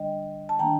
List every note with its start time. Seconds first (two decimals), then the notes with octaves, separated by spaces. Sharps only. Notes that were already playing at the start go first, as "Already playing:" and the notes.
Already playing: D3 G3 D4 D#5 G5
0.49 A5
0.59 D#3 A#3 D4 G5 A#5